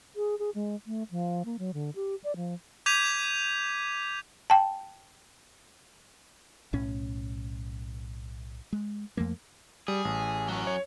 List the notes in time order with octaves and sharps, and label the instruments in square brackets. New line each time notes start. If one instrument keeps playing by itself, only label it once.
[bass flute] G#4
G#4
G#3
A3
F3
A#3
F#3
D3
G4
D5
F3
[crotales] D6 G6 G#6 B6 D#7 F7
[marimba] G5 A5
[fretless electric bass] B1 A2 C#4
G#3
F2 F3 A3 A#3
[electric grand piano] G3 [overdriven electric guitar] G#4
[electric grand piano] A1
[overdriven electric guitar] F#3 C#4
[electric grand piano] C#5